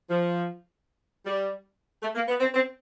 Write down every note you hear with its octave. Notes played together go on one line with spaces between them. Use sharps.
F3
G3
A3
A#3
B3
C4
C4